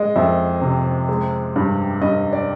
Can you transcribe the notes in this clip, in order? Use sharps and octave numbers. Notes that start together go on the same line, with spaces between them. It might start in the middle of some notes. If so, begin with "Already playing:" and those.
Already playing: G#3 D#5
F2 E5
C3
G#3
G2
G2 D#5
D5